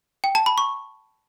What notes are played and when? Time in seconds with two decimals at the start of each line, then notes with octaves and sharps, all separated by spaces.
0.24 G5
0.35 A5
0.46 B5
0.58 C#6